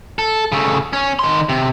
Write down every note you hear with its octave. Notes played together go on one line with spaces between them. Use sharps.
A4
C#3 A3
C#4
D#3 C6
C3